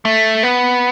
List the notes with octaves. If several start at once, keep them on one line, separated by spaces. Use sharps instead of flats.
A3
B3